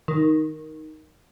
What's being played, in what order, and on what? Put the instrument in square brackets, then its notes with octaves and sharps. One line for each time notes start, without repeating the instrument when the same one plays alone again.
[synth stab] D#3